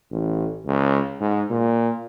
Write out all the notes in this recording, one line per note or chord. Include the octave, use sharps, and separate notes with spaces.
A1
C#2
G#2
A#2